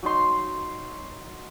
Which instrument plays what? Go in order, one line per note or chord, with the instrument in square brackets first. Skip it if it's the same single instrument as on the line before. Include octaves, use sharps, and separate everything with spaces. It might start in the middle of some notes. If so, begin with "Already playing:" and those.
[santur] F#3 D#4 C6